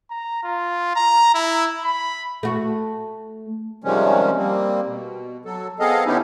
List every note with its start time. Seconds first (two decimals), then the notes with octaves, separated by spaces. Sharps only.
0.10 A#5
0.44 F4
0.96 A#5
1.34 E4
1.84 B5
2.43 A3 F#4
3.84 C3 D#3 F3 G3 G#3 C#4
4.37 G3 A#3 C4
4.87 B2
5.45 F#3 A4
5.79 B3 C4 G#4 A4 D#5 F5
6.06 D3 B3 C#4 D#4 E4 G4